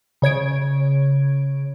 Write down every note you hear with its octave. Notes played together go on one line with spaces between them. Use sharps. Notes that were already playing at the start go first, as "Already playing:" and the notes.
C#3 C#5 G#6 D7